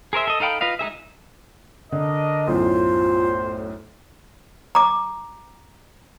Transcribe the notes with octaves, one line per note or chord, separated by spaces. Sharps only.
G#4 A#4 C5 E5
A4 D#5
D#4 A4 F5 G5 B5
F4 B4 D#5 F5
G#3 D#4 G#4 E5
D3 D4 A#4 D#5
B1 F#2 A2 F4 C5
A#5 D6